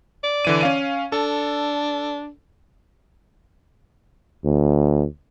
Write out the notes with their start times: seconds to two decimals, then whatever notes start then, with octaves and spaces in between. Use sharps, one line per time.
0.24 D5
0.45 D3 E3 D#7
0.61 C#4 F5 D#7
1.12 D4 A4
4.45 D2